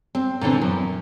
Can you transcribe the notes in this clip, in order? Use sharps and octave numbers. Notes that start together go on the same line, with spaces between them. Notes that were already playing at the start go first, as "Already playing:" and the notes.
C4
A#2 D3 E3 C4
F#2